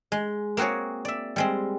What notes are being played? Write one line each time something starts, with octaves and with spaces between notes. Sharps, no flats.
G#3
A#3 C4 F#4 G#4 C#5
D5 E5
G3 G#3 C4